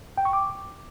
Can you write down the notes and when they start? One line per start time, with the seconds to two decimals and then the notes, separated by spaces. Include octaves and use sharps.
0.17 G5
0.25 C#6
0.33 D6